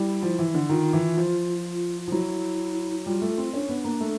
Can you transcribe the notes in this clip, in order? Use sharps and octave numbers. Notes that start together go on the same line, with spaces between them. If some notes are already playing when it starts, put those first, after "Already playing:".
Already playing: G3 E4
F3
E3
D3
D#3 F4
E3
F3
F3
F#3 E4
G3 F4
A3
C4
C#4 D4
B3
A#3
A3